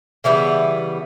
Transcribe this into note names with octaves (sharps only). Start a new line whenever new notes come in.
C#3 E3 G3 B3